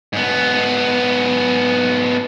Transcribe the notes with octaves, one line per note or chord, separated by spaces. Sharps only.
G#2 B3